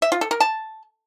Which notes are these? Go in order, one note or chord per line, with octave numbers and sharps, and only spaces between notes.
E5
F4
A4
A#4
A5